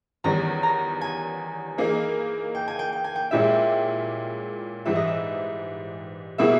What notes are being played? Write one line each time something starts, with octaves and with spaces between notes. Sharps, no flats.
E2 D#3 G3 C#4 A#5
A#5
G#5
E3 A#3 D#4 G#4
G5
G#5
G5
G5
G#5
G5
A#2 G#3 C#4 E4 G4 E5
G#2 E3 G3 E5
D#5
E5
B2 G3 A#3 E4 G#4 E5